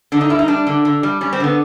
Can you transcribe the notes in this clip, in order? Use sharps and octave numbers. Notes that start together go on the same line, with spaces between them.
D3 D4
D#4
G3 E4
D#4
G3 D4
D3
D3
G3
G3 C#4
C4
D3 B3